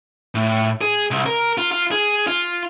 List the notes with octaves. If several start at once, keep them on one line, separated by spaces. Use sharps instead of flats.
A2
G#4
C2
A#4
F4
F4
G#4
F4